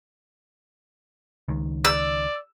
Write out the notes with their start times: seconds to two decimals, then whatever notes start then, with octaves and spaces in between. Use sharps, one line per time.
1.48 C#2 D#3
1.85 D5 E6